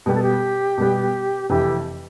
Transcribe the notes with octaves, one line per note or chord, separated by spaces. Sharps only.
B2 G3 B3 G4
A4
G4
B2 G3 B3
F1 F2 C3 E3 G4